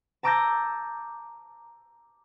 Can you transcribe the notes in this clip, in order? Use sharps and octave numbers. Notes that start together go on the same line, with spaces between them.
A5 A#5 D6 E6 G6 A#6